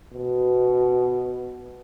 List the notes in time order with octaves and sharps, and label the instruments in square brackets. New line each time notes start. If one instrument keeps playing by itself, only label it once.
[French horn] B2